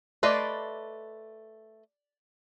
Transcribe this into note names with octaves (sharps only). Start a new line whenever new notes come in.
A3 B4 D5 D#5 C6